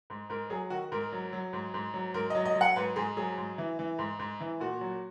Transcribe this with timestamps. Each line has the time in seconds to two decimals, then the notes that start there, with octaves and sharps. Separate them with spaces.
0.10 G#2
0.30 G#2 A#4
0.50 F#3 G#4
0.70 D#3 F#4
0.92 G#2 A#4
1.12 F#3
1.33 F#3
1.53 G#2
1.74 G#2
1.94 F#3
2.14 G#2 A#4
2.30 D#5
2.35 F#3
2.45 D#5
2.55 F#3
2.61 F#5
2.76 G#2 B4
2.96 G#2 G#4
3.17 F#3 G#4
3.38 G#2
3.58 E3
3.79 E3
3.99 G#2
4.19 G#2
4.40 E3
4.60 A#2 F#4
4.81 F#3